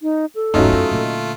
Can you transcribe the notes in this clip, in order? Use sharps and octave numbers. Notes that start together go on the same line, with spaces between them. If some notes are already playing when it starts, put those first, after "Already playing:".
D#4
A4
E1 G#2 F#3 A3 C#4 D#4 F4
F#2
A#2 D3